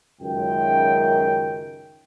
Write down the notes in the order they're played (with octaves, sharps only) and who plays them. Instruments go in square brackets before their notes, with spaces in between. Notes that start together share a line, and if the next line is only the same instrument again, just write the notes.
[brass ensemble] C#2 F#2 D#3 G5